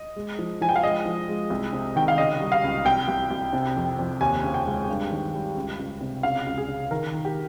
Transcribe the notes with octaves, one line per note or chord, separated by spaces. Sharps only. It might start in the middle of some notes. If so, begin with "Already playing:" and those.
Already playing: D#5
G#3
F3
F3 G#5
G5
F5
G#3 D#5
F3
G#3
C2
C3
D#3 G5
F5
C#3 D#5
G3
F5
C#2
C2 G5
C2
C2
C3
F2
F2
D#2 G#5
C#3
G5
G#3
G2
D#3
G3
C#2
C#2
C3
C#3 F5
C#2
G#4
C#3
D#3 A#4
D#3
G4